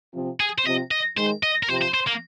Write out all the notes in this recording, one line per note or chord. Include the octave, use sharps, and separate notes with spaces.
C3 F3
G#4
C5
C3 F3 D#5
D#5
D#3 G#3 C5
D#5
A#4
C3 F3 C5
C5
C5
A#3